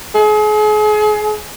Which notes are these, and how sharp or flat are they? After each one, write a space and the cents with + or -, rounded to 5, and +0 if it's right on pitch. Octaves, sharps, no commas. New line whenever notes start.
G#4 +35